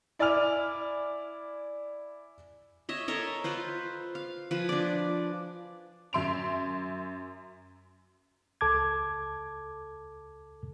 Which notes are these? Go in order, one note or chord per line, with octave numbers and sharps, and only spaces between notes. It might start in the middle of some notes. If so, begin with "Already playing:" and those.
E4 D5 G#5 D6 F6 F7
C#5 D#5 E5
A4 A#4 C#5 D#5
F4 B4 C5
F5
F3 B4 G#5
D4 D5
F#2 E5 C6 D7 F7
C#2 A4 A5 D6 G#6